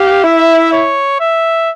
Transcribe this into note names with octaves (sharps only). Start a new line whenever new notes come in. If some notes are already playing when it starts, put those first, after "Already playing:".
Already playing: G4 F5
E4 E5
C#5
E5